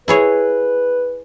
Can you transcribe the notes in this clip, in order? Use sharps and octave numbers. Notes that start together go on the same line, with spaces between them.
E4 G#4 B4 C#5